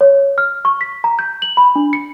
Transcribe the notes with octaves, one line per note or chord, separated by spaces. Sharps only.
C#5
F6
C#6
B6
A#5
G6
F#7
B5
D4
C#7